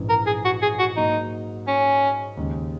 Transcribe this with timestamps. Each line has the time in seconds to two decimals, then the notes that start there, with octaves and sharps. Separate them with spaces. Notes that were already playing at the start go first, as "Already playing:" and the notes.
Already playing: A#1 G#2 E3 G#3 C#4
0.09 A#4
0.26 G#4
0.45 F#4
0.62 G#4
0.79 F#4
0.96 G#2 F#3 A#3 D#4
1.68 C#4
2.37 D#2 C#3 G#3